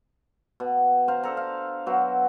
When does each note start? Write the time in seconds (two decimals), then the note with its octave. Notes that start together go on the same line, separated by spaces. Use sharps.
0.60 B2
1.08 C5 F5 A#5
1.23 D4 A4 A#5
1.37 F5
1.86 B2 F#3 C5